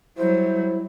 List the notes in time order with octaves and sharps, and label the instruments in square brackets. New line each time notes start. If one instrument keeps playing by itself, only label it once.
[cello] F#3 G3 [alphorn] E4 [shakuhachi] C5